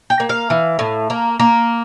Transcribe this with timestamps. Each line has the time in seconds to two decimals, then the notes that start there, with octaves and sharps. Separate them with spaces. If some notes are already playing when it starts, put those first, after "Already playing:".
0.10 G5
0.20 A#3
0.29 F5
0.50 E3
0.79 A2
1.10 A#3
1.40 A#3